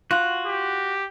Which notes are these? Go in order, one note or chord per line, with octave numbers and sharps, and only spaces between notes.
F4 F#4 F#5
G4